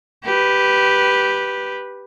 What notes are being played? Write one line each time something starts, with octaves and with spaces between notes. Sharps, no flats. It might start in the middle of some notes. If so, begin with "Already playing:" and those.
G4 B4